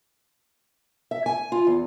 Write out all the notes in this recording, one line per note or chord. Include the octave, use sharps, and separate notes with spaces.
E5
G#5
F4
E2